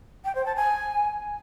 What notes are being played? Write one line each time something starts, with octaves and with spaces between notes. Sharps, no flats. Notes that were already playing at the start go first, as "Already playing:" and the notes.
G5
C5
A5
G#5